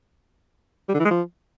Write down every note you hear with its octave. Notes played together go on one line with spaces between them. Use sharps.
G3
D3
E3
G#3
F3